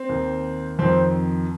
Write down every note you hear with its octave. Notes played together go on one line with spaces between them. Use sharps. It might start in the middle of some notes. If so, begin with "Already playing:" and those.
Already playing: C4
D#2 D#3
F2 D#3 C4